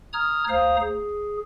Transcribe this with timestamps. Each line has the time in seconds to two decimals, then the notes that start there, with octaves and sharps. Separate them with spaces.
0.13 A#5 D#6 F6 G#6
0.49 D2 C5 F5 A#5 D#6
0.81 G#4